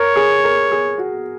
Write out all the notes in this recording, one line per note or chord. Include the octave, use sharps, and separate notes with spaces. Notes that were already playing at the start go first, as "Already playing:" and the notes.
Already playing: A#4 C#5
G#4
A#4
G#4
F#4